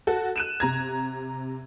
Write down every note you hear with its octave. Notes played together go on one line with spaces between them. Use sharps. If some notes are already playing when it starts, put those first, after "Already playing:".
F#4 A4
F#6 D#7 E7
C3 A#5 G#6